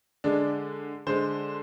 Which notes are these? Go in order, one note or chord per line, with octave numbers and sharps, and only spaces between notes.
D3 G#3 D4
D3 G#3 C5